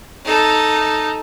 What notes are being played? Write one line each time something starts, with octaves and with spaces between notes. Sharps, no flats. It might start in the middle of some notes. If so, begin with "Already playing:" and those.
D#4 A4